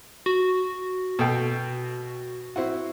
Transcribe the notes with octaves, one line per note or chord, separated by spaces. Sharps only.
F#4
B2 A4 G5
C4 E4 F#4